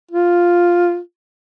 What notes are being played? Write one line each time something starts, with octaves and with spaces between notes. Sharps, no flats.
F4